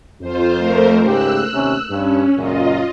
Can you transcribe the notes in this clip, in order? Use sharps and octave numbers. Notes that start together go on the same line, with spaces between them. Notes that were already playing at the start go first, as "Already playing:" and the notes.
F2 F4 C5
A3 A#4 C5
G#2 C#3 G4 E6 F#6
D#2 C3 C#4
G2 C#4
C#2 F#2 A#2 F4 D#5